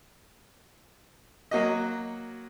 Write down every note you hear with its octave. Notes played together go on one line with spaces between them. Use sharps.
F#3 A#3 F#4 D#5